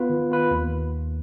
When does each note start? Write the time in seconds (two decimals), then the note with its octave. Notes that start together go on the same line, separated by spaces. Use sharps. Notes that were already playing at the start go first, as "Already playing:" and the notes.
Already playing: B3 F4 B4
0.10 D#3
0.30 B3 F4 B4
0.51 D#2